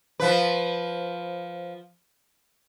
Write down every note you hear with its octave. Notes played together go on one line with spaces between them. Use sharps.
F3 B4